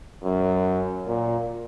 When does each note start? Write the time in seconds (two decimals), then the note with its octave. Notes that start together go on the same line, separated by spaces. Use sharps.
0.24 F#2
1.08 A#2